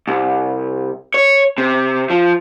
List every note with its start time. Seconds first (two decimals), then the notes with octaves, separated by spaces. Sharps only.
0.07 C2
1.14 C#5
1.58 C3
2.10 F3